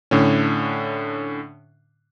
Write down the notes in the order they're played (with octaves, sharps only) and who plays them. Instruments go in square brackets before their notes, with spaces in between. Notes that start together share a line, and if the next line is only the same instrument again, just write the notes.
[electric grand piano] A2 D3 C#4